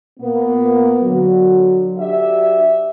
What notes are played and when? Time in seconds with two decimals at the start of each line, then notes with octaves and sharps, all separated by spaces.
0.20 A#2 A#3 B3
1.03 D3 F#3
1.98 D4 F#4 G4 E5